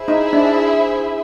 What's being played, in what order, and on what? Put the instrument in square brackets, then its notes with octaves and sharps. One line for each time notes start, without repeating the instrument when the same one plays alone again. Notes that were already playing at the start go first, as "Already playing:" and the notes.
Already playing: [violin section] E4 G#4 C5 E5
[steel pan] D#4
D4